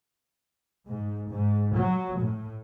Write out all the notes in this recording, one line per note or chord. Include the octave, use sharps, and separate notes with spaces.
G#2
G#2
F#3
A2